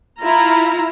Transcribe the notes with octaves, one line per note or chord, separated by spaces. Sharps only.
E4 F4 A#5